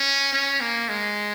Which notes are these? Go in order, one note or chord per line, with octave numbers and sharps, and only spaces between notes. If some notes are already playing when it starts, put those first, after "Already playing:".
Already playing: C#4
C#4
A#3
G#3